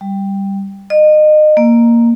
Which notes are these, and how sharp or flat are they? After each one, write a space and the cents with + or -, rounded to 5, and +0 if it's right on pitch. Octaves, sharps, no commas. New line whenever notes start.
G3 +5
D#5 -30
A#3 +0